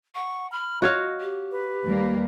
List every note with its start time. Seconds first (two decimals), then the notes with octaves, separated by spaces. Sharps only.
0.15 F#5 C#6
0.52 B5 F6
0.82 F4 F#4 C#5 D#5 F5
1.20 G4
1.51 B4
1.86 D#2 G3 A#3